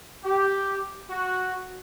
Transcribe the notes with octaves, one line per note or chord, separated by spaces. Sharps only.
G4
F#4